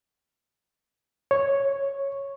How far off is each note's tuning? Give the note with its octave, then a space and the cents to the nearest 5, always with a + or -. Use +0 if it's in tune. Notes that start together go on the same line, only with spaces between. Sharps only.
C#5 -5